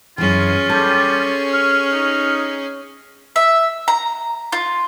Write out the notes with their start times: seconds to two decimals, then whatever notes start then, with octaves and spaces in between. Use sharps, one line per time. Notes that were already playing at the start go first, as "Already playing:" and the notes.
0.18 F#2 E3 C#4 F4 G#4
0.70 G3 A4
1.52 F6
1.91 D#4
3.36 E5
3.88 A#5
4.52 F4